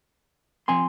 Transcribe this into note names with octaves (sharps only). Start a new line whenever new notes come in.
F3 C4 G#5 C6